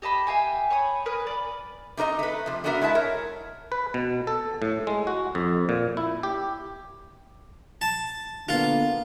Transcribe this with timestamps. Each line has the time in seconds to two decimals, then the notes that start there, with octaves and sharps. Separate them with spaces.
0.02 G4 D#5 A5 B5
0.27 E5 F5 G5 G#5
0.70 C#5 B5 D#6
1.05 A#4 B4 D#5 G#5
1.27 D5 B5
1.97 C3 D#4 A#4 D#5 A#5
2.19 A3 B4
2.46 C3 F3
2.64 A3 B3 D4 F#4 A#4 E5
2.81 G#3 E4 E5 A5
2.95 A#4 C#5
3.72 B4
3.94 B2
4.27 A4
4.62 A2
4.87 G#3
5.07 F#4
5.35 F2
5.69 A#2
5.97 E4
6.23 G4
7.81 A5
8.49 D3 A#3 B3 F4